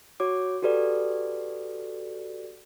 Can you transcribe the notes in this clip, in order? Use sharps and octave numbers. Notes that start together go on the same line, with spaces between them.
F#4 C#5 D6
F#4 G4 A4 B4 D5